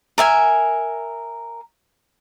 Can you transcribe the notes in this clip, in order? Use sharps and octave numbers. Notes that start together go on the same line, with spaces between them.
A#4 E5 G#5